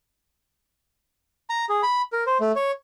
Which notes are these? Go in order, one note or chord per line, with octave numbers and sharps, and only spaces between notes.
A#5
G#4
B5
A#4
C5
A3
C#5